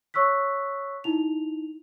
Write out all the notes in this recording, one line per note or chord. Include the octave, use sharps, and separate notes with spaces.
C#5 C#6 E6 F#6 B6
D#4 E4 F7